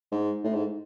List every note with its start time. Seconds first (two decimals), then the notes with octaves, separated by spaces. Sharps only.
0.12 G#2
0.44 A2
0.54 G#2